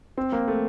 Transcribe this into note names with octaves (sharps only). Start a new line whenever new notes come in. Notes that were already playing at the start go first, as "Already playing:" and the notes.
C4
A#3
A3